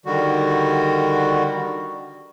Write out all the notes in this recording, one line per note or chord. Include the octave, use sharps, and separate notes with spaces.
D3 D#3 G3 F#4